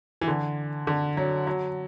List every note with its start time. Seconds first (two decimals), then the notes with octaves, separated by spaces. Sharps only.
0.21 E3
0.28 D3
0.87 D3
1.17 F#3
1.47 F#3